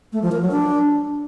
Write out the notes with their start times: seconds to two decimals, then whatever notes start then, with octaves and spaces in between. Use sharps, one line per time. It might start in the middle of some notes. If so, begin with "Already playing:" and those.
0.13 A3
0.22 F3
0.32 A#4
0.42 F#3
0.51 D4